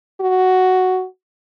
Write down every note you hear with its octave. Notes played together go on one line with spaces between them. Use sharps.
F#4